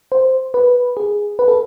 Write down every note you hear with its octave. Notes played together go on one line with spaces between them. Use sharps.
C5
B4
G#4
B4
A4